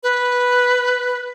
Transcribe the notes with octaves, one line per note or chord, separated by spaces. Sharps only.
B4